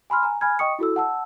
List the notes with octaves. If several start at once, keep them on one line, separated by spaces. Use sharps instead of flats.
G#5 B5 C6 F6
G#5 A#5
G#5 B5 F6 G#6
D#5 G5 C#6 D#6 C#7
E4 F#4 A4 E6
F#5 A5 E6